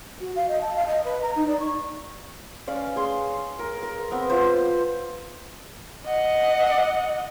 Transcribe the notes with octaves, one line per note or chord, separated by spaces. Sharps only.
F#4
F5
D#5
A5
F5
D#5
B4
A#5
D#4
D5
C#6
C#4 D5 F5
G#4 C#5 C6
A#4
A#4
B3 C4
F4 B4 C5
D#5 F#5